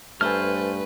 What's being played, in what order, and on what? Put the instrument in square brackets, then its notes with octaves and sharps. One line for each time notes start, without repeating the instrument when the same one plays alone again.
[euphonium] G2 [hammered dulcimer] A3 G#5 [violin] B4 [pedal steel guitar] C5 F6